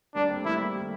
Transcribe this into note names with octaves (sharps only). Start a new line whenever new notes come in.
G3 A#3 D4
A3 C4
G3 A#3 E4
A3
G3